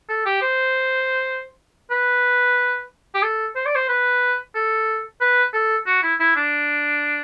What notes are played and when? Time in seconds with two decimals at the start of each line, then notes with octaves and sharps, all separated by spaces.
0.09 A4
0.26 G4
0.42 C5
1.91 B4
3.15 G4
3.23 A4
3.56 C5
3.66 D5
3.76 C5
3.89 B4
4.55 A4
5.21 B4
5.54 A4
5.87 F#4
6.03 E4
6.20 E4
6.36 D4